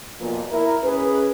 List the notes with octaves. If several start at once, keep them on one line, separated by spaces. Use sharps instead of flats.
B1 A#2 F3 B4
E4 A#4 E5
C#4 G#4 B4